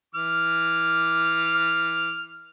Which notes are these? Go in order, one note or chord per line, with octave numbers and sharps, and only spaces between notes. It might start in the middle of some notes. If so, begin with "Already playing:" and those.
E3 D6 F6